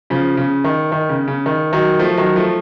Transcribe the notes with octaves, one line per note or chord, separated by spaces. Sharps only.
C#3 F3
C#3
D#3
D#3
C#3
C#3
D#3
D#3 F#3
F3 A3
D#3 F#3
F3 A3